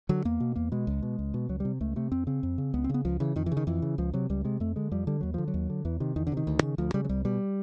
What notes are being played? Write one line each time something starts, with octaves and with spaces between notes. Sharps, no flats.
D3 F#3
E2 A#3
B2
E2 A#3
B2 G#3
C#2
B2
C#2
B2
C#2 F#3
C3 G3
C#2 A3
C3 A3
F2 C4
C#3 C4
F2
C#3
C#2 B3
C4
C#3 B3
C#2 F3
C#3 E3
F2 D#3
E3
C#3
D#3
F2 E3
C#3
C#2 F3
C3 F#3
C#2 G3
C3 G#3
F2 A3
D3 G#3
F2 G3
D3 G3
D#2 F#3
D3 F3
F#3
D#2
D3
E2 E3
C3 D#3
E2 D#3
D3
C3
D#3
D2
C#3
D2 F3
C#3 G3
F#3
C2 G3
B2 G3